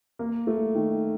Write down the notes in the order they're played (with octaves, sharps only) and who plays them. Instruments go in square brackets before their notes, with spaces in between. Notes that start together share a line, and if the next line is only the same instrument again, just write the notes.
[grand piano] A#3
A3
D#3